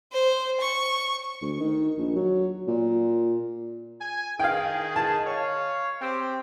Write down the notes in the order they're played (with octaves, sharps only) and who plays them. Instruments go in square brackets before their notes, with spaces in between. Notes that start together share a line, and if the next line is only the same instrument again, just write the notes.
[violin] C5
C#6
[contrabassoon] D2
D#3
A#1
F#3
A#2
[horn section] G#5
[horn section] D#3 G#4 [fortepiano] F5 G5
[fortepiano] A5
[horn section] C#5 F5
C4 G4